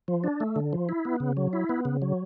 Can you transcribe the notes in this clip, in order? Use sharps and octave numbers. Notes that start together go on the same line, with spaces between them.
F3
D4
A3
D3
F3
E4
B3
C#3
F#3
E4
B3
C#3
F#3